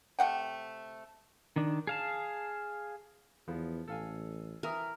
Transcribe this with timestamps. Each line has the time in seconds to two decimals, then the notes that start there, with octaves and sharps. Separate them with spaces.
0.19 C3 A3 F#5 G5
1.56 D#3 D4
1.87 G#4 F5 A5
3.48 E2 F3 B3
3.88 A1 A4 F5 G#5
4.63 E3 A#4 E5 D#6